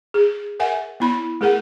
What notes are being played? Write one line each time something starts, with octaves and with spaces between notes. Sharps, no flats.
G#4
A#4 E5 F#5 G#5
B3 E4 B5
A3 G#4 A#4 F#5